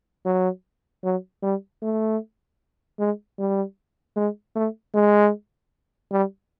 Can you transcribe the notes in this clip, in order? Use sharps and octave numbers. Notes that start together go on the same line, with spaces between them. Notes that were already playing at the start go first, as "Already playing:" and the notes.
F#3
F#3
G3
A3
G#3
G3
G#3
A3
G#3
G3